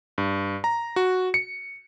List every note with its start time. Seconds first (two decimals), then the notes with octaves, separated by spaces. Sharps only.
0.18 G2
0.64 A#5
0.96 F#4
1.34 C#7